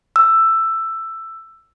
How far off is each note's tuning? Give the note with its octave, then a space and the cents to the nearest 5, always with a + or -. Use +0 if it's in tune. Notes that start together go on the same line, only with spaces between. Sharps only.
E6 +10